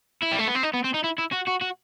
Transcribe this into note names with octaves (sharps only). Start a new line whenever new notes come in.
E4
G3
A3
B3
C4
D#4
B3
C4
D#4
E4
E4
F#4
F#4
F#4